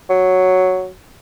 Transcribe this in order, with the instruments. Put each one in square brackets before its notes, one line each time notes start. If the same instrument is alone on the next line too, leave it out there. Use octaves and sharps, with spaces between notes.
[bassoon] F#3